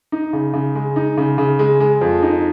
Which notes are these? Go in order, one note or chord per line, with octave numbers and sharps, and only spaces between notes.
D#4
C#3
C#3
G#3
D#4
C#3
C#3
G#3
G#3
F2
D#4